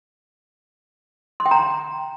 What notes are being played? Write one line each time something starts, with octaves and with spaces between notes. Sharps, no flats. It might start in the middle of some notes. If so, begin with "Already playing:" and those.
C6
G5
A#5